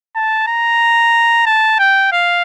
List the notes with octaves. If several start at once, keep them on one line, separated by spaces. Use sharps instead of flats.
A5
A#5
A5
G5
F5